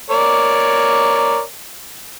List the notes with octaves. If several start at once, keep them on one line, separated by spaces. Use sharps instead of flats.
A#4 C#5 D5